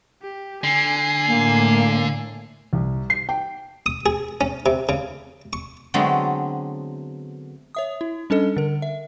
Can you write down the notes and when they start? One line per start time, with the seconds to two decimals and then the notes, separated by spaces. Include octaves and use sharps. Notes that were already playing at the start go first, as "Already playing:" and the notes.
0.22 G4
0.64 D3 G#5 C7
1.27 A2 A#3
2.73 C2
3.10 C7
3.29 G5
3.86 D#6
4.06 G#4
4.41 C#4
4.66 C3
4.89 C#3
5.53 C#6
5.94 D3 F#3 G#3 A3 B3 C4
7.75 C#5 E5 D#6
8.01 E4
8.30 G3 C#4 D4 A4 D#5
8.57 D3 A#4
8.82 E5